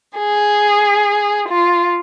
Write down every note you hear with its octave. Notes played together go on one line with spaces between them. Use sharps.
G#4
F4